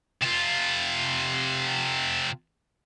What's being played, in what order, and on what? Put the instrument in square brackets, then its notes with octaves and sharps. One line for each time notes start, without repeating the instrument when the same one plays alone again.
[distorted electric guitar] C3 F4